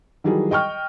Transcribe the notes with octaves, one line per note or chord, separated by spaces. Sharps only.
D#3 E3 F#3 G3 G#4
D#5 G5 C#6 F6